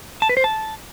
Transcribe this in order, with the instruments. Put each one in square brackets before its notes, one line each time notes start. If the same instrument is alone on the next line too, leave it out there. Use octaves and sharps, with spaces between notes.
[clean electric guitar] A5
B4
C5
A5